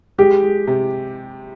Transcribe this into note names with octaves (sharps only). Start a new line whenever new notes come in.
G#3 G4
G#3
C3